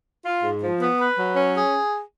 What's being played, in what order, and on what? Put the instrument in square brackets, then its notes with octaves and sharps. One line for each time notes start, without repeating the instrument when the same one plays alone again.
[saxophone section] F4
G#2
F3
B3
B4
F#3
C#4
G#4